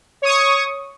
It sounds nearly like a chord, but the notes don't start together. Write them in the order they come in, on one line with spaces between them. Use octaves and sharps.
C#5 D#6 C#6